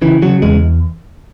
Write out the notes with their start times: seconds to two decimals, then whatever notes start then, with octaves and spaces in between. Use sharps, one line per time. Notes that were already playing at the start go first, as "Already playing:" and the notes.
0.02 C#3 E3
0.22 C#3 F#3
0.42 E2 G#3